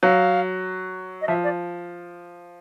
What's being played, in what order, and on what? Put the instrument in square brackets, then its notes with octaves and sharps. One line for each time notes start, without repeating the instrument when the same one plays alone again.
[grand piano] F#3 [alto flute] F5
[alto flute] D#5
[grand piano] F3 [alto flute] E5
[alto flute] D5